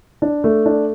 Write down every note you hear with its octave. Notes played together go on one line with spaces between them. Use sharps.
D4
A3
D4